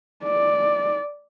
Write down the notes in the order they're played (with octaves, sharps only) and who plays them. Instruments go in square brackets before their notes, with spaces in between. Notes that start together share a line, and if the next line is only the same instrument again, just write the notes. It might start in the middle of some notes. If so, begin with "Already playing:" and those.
[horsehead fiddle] D5